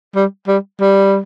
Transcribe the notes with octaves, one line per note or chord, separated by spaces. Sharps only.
G3
G3
G3